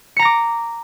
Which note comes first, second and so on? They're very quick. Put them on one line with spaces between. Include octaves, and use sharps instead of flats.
C#7 A#5 A#6 D6